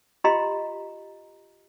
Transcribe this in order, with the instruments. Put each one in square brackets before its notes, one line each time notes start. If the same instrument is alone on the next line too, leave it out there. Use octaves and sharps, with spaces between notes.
[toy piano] F4 G4 D#5 A#5 C6